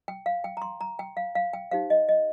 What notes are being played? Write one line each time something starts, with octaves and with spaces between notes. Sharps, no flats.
G5
F5
G5
A#5
C6
A#5
G5
F5
F5
G5
D#4 G4 C5 F5
D#5
D#5